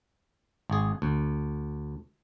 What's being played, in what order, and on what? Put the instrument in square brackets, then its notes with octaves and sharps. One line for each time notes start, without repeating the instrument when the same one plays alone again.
[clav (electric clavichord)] G#1 G#4
D2